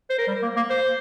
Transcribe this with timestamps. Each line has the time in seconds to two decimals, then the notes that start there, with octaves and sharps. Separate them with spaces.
0.10 C5
0.18 A#4
0.28 G3
0.43 A#3
0.57 A#3
0.70 C5